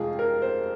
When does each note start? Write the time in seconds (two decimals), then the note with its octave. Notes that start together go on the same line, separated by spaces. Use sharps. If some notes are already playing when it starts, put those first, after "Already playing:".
Already playing: F2 C3 G#3 F4 G#4
0.19 A#4
0.42 C5